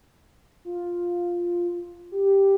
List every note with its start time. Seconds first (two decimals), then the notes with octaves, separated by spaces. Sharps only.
0.65 F4
2.11 G4